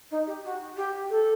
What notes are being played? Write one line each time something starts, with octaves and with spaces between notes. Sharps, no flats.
D#4
G4
F#4
G4
A4